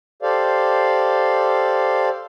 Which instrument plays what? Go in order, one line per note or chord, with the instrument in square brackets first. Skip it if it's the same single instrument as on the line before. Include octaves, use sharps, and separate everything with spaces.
[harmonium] G4 A4 C5 D5 F5